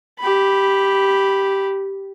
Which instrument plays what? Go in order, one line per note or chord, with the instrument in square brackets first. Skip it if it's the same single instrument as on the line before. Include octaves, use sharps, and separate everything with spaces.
[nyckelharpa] G4 B5